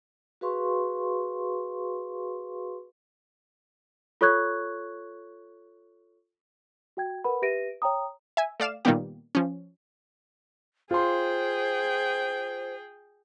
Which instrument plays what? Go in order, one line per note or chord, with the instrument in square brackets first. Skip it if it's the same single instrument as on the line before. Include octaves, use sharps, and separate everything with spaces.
[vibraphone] F#4 G#4 B4 F5 C6 C#6
[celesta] F4 A4 C#5 C#6 F#6 G#6
F#4 G5 G#6
A#4 B4 F#5 B5
G4 B4 E5 A#6 D7 D#7
C#5 G5 A#5 D#6
[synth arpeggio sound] E5 G#5
A3 D5 F5 E7
A#2 D#3 G3 A#3 B3 G4
F3 C#4
[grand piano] F4 C6 [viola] G#4 G5 [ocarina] C5